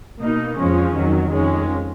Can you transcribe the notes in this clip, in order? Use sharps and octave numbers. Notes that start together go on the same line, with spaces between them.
B2 A#3 D#4
F2 F3 G#3 C#4
F2 D#3 F#3
F2 D#3 G#3 C#4